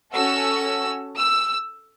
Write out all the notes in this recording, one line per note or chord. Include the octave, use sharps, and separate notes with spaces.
C#4 F#4 A4 E6
E6